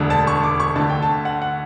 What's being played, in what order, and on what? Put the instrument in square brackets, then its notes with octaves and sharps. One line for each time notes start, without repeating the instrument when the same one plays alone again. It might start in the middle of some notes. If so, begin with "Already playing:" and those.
Already playing: [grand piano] E1 D2 D3
A5
C#6
D6
C#6
D2 D3 A5
G5
A5
F#5
F#5